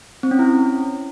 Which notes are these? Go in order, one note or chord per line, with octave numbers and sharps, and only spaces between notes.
C4
C#4
E4
C#4